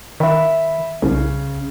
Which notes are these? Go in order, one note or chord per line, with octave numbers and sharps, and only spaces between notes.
D#3 E5 B5
C2 C#3